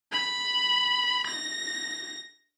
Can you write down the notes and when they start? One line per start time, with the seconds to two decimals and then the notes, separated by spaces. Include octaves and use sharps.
0.12 B5
1.27 A#6